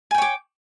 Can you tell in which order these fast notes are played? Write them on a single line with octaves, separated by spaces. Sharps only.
G#5 G5 C#5 D6